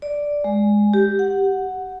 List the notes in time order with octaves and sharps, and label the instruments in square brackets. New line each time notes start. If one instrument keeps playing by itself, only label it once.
[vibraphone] D5
G#3
G4
F#5